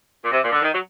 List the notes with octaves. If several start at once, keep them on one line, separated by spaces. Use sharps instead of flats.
A#2
C3
A#2
D3
D#3
F#3